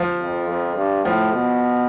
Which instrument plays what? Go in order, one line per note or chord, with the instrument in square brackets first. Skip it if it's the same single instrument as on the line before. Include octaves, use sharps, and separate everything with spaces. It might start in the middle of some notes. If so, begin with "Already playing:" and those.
Already playing: [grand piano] F3
[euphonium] F2
F2
G2
[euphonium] A2 [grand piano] F3
[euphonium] B2